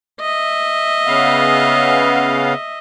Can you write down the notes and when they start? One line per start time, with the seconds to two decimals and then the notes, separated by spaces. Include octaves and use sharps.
0.21 D#5 E5
1.07 C#3 B3 F5